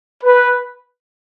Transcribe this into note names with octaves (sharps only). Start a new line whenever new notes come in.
B4